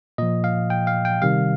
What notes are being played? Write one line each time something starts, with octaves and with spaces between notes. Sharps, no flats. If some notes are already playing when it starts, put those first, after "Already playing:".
A#2 F3 D#5
F5
G5
F5
G5
C3 D#3 G3 F5